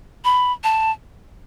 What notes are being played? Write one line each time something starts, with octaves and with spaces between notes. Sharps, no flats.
B5
A5